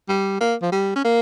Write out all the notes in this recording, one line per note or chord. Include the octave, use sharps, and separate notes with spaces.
G3
A#3
F3
G3
C#4
A#3